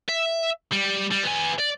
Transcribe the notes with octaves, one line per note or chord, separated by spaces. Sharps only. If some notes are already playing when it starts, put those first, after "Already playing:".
E5
G3
G3
B3 G#5
D5